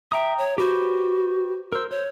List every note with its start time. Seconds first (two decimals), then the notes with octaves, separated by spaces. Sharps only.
0.12 E5 G5 A#5 D#6
0.38 C#5
0.58 F#4 G4 B4 C5
1.72 A#4 C5 E6
1.91 C5 C#5